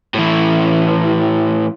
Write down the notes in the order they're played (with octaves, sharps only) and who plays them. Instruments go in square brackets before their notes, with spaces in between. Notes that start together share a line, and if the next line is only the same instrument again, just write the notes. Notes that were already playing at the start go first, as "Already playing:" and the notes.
[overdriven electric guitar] A2 E3